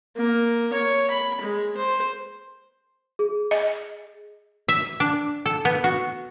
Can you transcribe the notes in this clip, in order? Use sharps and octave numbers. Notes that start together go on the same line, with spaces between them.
A#3
C#5
B5
G#3
C5
G#4
D#5
E5
D4
A4
B3
F#4